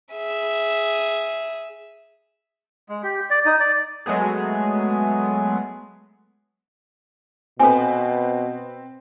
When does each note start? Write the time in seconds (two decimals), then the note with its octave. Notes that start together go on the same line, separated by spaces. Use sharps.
0.14 G#4 E5
2.89 G#3
3.03 G4
3.30 D5
3.46 D#4
3.60 D5
4.06 F#3 G#3 A3 B3 G#4
7.60 B2 C4 A4 B4 G#5